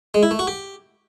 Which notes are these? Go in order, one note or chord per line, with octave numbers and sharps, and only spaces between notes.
G#3
E4
A3
F#4
G4